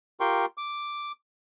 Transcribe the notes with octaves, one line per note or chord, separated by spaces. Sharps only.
F4 G4 A#4 G5 C6 C#6
D6